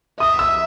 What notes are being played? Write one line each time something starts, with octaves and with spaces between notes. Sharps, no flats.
E5 D#6
E6